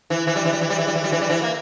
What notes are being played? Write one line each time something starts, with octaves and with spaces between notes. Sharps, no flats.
E3
E3
G3
E3
G3
E3
G3
E3
G3
E3
G3
E3
G3
E3
A#3